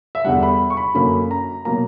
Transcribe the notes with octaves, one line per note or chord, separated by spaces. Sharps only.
E5
E2 D3 G3 F#5
B5
C#6
B5
F#2 D3 F#3 A#3 B5
A#5
B2 F#3 A#3 A#5